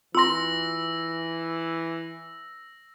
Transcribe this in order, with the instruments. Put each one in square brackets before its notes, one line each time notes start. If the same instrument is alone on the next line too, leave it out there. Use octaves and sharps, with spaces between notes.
[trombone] E3 [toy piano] F4 C6 [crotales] E6 A#6